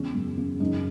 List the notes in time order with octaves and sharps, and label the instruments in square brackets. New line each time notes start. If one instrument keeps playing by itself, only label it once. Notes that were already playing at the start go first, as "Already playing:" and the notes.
Already playing: [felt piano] E2 C#3 G#3 C#4
F#2
C#3
F#2 D#4